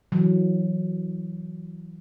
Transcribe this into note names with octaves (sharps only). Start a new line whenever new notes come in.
E3 F#3